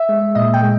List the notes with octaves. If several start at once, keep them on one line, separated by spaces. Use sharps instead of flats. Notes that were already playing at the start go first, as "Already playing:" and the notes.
Already playing: E5
G#3
A#2 D#5
G5
G#3